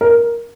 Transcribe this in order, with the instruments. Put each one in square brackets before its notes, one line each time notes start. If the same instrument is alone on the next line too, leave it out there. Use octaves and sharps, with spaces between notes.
[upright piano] A#4